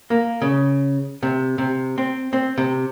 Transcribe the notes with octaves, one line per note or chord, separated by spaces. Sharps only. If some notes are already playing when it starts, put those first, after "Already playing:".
A#3
C#3
C3
C3
C4
C4
C3